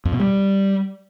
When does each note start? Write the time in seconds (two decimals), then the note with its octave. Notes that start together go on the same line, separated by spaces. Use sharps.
0.05 F2
0.13 B2
0.20 G3